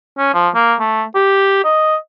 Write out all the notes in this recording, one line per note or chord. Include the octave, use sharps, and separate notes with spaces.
C#4
F3
A#3
A3
G4
D#5